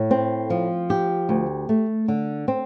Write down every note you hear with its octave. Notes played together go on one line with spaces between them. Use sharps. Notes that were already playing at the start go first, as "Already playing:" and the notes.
Already playing: A2
C4
F3
G4
D2
A3
D3
C4